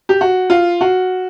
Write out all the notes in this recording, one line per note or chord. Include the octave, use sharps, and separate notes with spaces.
G4
F#4
F4
F#4